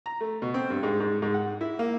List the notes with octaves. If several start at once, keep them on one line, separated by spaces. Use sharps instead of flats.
A#5
A3
B2
C4
G2
G#2
G#2
G#2
F#5
E4
A#3